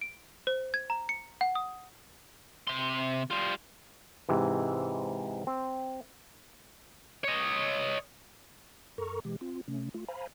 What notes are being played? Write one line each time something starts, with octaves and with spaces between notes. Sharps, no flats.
D7
C5
G#6
A#5
C#7
F#5
D#6
C3 C6
G3 F4
G#2 C3 E3
C4
C#5 D#5
F#2 A4 A#4 A#5 C#6
B2 E3 G#3 G4
C4 F4
C3 A3 C#4
A3 F4
C5 F5 G#5 A#5 B5